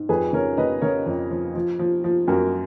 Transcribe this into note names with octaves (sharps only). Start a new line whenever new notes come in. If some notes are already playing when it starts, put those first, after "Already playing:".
Already playing: G#2
F2 G#4 B4
C#3 A#4 C#5
C#3 B4 D#5
C#3 A#4 C#5
F2
F3
F3
F3
F3
F#2 F#4 A#4